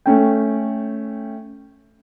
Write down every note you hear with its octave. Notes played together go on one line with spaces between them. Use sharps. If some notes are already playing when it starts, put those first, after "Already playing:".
A3 C#4 G5